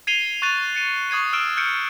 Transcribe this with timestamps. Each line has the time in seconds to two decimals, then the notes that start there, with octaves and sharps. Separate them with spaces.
0.07 G#6 C7 D#7 F7 G7
0.42 C#6 F#6 A6 D#7 F7
0.75 A6 C#7 D#7
1.10 C#6 D#6 G#6 C7 D#7
1.33 E6 F6 G#6 D7 E7
1.57 F6 G6 C#7 D7